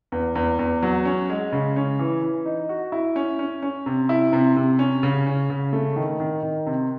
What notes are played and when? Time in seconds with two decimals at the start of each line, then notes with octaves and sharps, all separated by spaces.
0.12 E2
0.35 E2
0.59 E2
0.83 F#3
1.05 C#4
1.30 G#3
1.52 C#3
1.76 C#4
1.99 E3
2.22 E3
2.45 D#4
2.69 F#4
2.92 E4
3.16 C#4
3.39 C#4
3.63 C#4
3.86 C3
4.09 E4
4.33 C3
4.56 C3
4.79 C#4
5.03 C#3
5.26 C#4
5.50 C#3
5.73 A3
5.96 D#3
6.20 D#3
6.43 D#3
6.66 C3